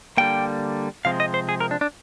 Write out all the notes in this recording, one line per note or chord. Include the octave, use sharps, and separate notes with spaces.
D3 G3 A#3 G5
C3 F3 G#3 C4 F5
D#5
C5
G#4
A#4
D4
D4